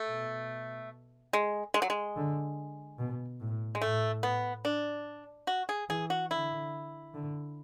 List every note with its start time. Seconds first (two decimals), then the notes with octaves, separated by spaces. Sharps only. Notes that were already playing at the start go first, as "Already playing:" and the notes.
Already playing: A3
0.08 B2
1.33 G#3
1.74 G#3
1.82 F#3
1.90 G#3
2.17 D3
2.99 B2
3.40 A2
3.75 G#3
3.81 A2 A3
4.23 B3
4.65 D4
5.47 F#4
5.69 G#4
5.89 E3 G#4
6.10 F#4
6.31 D3 E4
7.14 D3